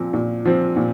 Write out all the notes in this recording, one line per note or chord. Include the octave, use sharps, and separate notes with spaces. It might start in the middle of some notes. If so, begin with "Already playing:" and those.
Already playing: A#2 F3 C4
A#2
F3 C4
A#2